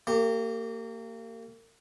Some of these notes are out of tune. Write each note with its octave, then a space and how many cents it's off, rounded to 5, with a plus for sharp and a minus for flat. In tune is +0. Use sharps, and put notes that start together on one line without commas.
A#3 -35 G4 +0